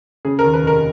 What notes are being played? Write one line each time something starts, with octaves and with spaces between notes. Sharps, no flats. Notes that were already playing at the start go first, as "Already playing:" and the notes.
C#3 G#4
A#4
D#2
B4
F1 A#4